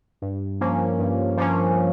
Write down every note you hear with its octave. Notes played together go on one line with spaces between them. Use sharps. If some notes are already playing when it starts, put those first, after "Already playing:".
G2
F3 A#3 C#4
G2
F3 A#3 C#4